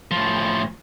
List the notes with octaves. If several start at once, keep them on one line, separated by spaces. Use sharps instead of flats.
A2 F3